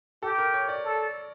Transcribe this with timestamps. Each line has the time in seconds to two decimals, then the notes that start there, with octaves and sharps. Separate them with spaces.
0.23 G4 A4
0.38 A#4
0.54 C#5
0.69 D5
0.85 A4